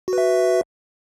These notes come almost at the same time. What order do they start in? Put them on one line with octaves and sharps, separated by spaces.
F#4 B4 E5